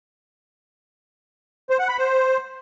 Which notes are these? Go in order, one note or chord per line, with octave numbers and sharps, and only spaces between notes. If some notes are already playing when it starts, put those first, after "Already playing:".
C5
F#5
B5
C5